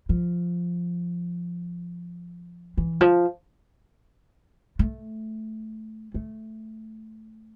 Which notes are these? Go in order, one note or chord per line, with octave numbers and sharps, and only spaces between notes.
F3
E3
F3
A3
A3